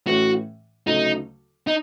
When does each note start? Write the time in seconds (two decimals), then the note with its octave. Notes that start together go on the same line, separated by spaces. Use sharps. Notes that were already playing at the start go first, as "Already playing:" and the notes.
0.07 A2 E3 A3 C#4 F#4
0.87 D2 C#3 F#3 A3 D#4
1.67 D#4